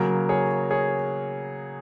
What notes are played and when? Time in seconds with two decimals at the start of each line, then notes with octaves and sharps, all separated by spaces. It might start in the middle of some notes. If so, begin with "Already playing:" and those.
Already playing: C#3 F#3 A#3 F#4 A#4
0.29 G#4 C#5
0.71 G#4 C#5